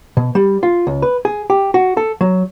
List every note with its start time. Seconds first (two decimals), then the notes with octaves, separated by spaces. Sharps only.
0.17 B2
0.35 G3
0.63 F4
0.87 C#2
1.02 B4
1.25 G#4
1.50 G4
1.74 F#4
1.97 A4
2.21 F#3